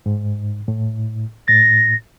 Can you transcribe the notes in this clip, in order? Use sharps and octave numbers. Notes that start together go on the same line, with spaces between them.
G#2
A2
A2 A6 A#6